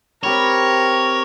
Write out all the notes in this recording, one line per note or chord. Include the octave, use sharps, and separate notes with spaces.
C4 G4 A#4 C#5 B5